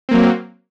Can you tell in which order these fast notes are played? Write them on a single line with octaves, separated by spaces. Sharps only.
C4 A#3 F#3